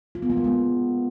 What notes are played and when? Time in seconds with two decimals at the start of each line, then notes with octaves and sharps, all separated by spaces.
0.15 F4
0.22 B3
0.30 A#3
0.37 G#3
0.44 B3